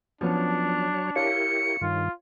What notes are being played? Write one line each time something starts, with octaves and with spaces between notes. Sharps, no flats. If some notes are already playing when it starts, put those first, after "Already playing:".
F3 F#3 B3 C#4 D4 C#5
E4 G4 A#4 C#5 F5 C#7
G2 D#3 F4